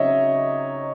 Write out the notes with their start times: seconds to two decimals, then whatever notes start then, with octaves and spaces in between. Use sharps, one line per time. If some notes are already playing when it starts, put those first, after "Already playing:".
Already playing: C#3 F#3 C4 D#4 C#5 D#5 E5